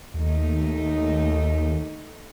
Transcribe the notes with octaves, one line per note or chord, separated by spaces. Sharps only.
D#2 A3 D#4